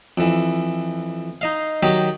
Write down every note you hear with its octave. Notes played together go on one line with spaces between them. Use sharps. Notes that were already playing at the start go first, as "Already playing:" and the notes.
F2 E3
D#4 D#5 F5
D#3 F#3 G4 D#5